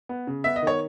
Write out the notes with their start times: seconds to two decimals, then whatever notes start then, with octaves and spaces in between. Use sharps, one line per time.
0.09 B3
0.27 C#3
0.44 B3 E5
0.56 D#5
0.62 D#3
0.67 C#5